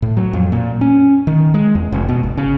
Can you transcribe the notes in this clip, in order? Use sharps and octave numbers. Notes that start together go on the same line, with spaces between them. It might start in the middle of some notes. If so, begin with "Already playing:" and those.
A2
F#3
F2
A#2
C#4
D#3
G#3
E2
F1
B2
G#1
C#3